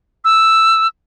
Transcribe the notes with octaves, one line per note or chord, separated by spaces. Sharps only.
E6